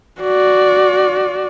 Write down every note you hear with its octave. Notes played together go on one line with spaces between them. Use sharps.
F#4 D5